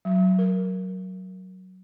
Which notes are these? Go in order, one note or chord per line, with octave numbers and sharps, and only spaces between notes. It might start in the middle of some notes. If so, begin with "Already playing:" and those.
F#3
A#4